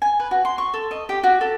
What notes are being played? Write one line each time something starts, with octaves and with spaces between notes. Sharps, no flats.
G#5
B4
F#4
C6
C#6
A4
D#5
G4
F#4
A4